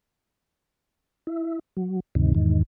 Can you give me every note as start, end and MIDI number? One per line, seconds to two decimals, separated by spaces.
1.27 1.59 64
1.77 2.00 54
2.15 2.33 38
2.15 2.33 43
2.15 2.33 48
2.15 2.33 51
2.35 2.63 40
2.35 2.63 44
2.35 2.63 51